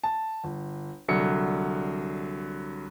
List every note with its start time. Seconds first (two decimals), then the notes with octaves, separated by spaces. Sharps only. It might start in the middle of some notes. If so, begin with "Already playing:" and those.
0.04 A5
0.44 G1
1.08 C2 D3 F#3 C#7